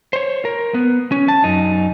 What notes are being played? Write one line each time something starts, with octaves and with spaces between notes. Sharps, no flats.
C5 C#5
A#4
B3
C#4
A5
F#2 D#4